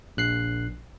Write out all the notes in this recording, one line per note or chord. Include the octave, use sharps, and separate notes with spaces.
A#1 F#6 C7